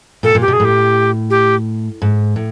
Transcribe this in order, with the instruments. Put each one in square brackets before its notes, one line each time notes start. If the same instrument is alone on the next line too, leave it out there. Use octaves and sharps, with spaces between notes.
[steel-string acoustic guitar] A#2 [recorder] A4
[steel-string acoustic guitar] A#2
[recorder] G4
[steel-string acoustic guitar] B2
[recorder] G#4
[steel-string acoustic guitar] A2
[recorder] G4
G4
[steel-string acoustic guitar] G#2
A2